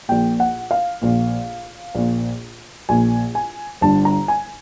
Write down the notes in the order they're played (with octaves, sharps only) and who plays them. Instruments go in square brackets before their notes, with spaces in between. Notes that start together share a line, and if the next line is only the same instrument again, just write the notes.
[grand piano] A#1 A#2 G5
F#5
F5
A#1 A#2
A#1 A#2
A#1 A#2 G#5
G#5
G1 G2 D3 A5
A#5
G#5